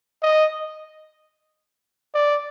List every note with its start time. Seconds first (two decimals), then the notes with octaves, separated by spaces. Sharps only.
0.22 D#5
2.14 D5